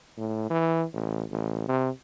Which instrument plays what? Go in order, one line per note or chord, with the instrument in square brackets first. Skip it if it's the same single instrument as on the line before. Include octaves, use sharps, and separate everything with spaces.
[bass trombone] A2
E3
A1
A1
C3